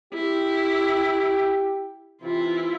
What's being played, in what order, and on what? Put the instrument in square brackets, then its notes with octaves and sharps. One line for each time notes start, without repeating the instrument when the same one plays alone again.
[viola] E4 [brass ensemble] G4
[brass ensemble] C3 E3 [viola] E4 F4